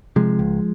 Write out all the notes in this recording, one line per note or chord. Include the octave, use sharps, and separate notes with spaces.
C3 F3 G#3
C#2